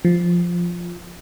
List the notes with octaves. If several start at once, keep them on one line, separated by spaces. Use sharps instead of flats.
F3